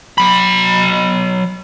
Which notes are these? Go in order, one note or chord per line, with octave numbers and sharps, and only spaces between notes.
F#3 B5